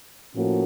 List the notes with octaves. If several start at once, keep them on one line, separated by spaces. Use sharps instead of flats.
A2 F3 A#3 C#4 F#4